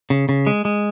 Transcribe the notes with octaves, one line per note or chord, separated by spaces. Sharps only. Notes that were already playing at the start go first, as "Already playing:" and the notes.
C#3
C#3
G#3
G#3